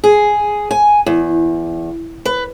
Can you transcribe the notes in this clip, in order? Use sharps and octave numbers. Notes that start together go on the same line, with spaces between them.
G#4
G#5
E2
B4